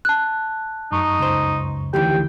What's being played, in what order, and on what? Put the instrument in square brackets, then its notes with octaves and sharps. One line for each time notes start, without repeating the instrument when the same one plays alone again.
[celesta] A5 F#6
[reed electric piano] F#2 C#6 [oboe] D#4
[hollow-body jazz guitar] C#2 C5
[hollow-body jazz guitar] D2 D#3 E3 [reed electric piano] G4 [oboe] G5